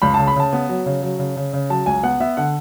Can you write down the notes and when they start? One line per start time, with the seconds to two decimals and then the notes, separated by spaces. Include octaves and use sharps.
0.02 C#2 B5
0.14 C#3 A5
0.27 B5
0.36 C#3 A5
0.53 B3
0.69 F#3
0.86 C#3
1.02 F#3
1.19 C#3
1.36 C#3
1.53 C#3
1.70 F#3 A5
1.86 C#2 G#5
2.03 B3 F#5
2.20 B3 E5
2.37 D3 F#5